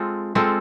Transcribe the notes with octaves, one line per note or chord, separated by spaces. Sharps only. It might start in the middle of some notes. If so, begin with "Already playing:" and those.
Already playing: G#3 C4 F4 A4
G#3 C4 F4 A4